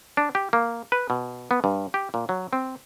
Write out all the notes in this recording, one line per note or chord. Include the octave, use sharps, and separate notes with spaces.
D4
G4
A#3
B4
B2
B3
G2
G4
A#2
F#3
C4